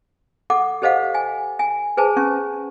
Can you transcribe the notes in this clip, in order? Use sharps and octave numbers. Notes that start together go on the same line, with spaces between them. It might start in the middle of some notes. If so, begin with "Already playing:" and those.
A4 F#5 D6
G4 A4 C5 D#5 F5 F#5
G#5
G#5
G#4 B4 C5 G#5 A5
C#4 C#6